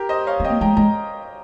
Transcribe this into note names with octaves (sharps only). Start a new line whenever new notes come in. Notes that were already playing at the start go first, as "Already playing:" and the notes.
Already playing: G4 A#4
C5 D#5
C#5 F5
C4 D#5 G5
A#3
G#3 G5 A#5
G#3 A#5